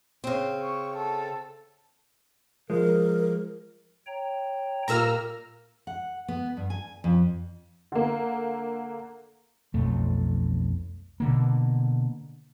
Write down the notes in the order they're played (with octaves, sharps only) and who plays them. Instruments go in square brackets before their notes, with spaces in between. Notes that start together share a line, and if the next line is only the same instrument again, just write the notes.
[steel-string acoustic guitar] C#3 C4
[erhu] C#6
A4
[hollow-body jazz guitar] F3 G#3 [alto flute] A#4
[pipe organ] C#5 G5 A#5
[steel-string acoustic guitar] A#2 G3 A#3 [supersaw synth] A#5 E6 F6
[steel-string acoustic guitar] F#5
B3
G2
G#5
F2
[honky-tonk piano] D3 A#3
[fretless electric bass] B1 F2 A3
B2 D3 A#3